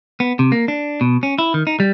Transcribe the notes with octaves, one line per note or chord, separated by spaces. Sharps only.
B3
C3
A#3
D4
B2
C#4
E4
D#3
D#4
G3